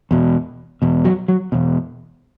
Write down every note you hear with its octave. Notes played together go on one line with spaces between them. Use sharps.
E2 B2
E2 B2
F#3
F#3
E2 B2